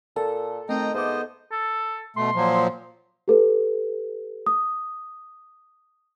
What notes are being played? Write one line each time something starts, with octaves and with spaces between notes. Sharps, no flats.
A#2 A4 A#4
D#3 A3 C4 D#5 G5 A#5
G#2 B3 C5 D#5 E5 D6
A4
B2 A3 C6
A#2 F3 F#3
G4 A4 B4
D#6